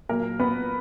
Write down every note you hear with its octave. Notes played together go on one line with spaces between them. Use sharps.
A#2 F#3 A#3 A#4
B3 B4